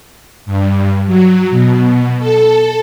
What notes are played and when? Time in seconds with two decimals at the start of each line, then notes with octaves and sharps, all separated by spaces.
0.46 G2
1.07 F#3
1.51 B2
2.19 A4